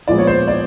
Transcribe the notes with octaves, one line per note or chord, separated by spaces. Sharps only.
A#2 F3 G#3 B3 D5
C#5
C5
D5